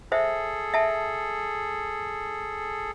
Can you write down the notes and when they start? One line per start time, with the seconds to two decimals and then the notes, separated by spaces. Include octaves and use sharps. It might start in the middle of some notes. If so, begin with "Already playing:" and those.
0.12 G#4 A4 C5 E5
0.74 E5 A5